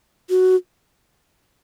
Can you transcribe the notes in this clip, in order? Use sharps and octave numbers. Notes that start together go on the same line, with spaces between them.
F#4